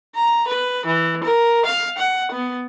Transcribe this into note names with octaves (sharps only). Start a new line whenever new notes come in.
A#5
B4
E3
A#4
F5
F#5
B3